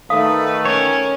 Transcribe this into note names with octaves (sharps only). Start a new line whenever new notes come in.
D#3 A3 B4 F5 D#6
C#4 A#4 C#5